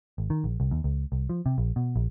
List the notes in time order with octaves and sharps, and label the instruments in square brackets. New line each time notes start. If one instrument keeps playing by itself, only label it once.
[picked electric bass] G#1
D#3
A#1
C2
D#2
C#2
C2
F3
C3
A#1
B2
A#1